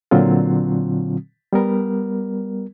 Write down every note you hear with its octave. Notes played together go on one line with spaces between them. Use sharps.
A#2 D3 F#3 C4 F4
G3 B3 A#4